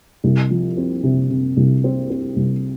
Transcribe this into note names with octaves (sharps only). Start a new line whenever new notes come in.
C2
F3
C4
C3
C3
C2
C4
C4
C2